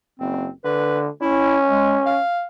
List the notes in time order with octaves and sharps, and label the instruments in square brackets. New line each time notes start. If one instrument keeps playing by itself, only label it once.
[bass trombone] F#1 [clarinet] C4
[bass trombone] D3 [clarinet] B4
[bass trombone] C#4 [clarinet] E4
[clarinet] G#3
F5